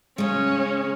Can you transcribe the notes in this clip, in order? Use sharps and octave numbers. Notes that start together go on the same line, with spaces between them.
C#3 G#3 C#4